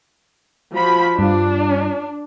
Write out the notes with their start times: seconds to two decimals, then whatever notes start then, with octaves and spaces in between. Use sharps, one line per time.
0.73 F3 F#4 B5
1.19 G2 D4 F4